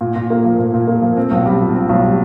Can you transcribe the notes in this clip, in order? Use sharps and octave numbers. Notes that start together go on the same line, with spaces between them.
A#2
A#2
A#3
F3
A#2
A#2
A#3
F3
C4
B1
G3
A#2
C4
B1
G3